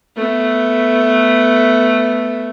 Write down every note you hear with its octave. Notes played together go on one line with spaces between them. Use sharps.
A3 B3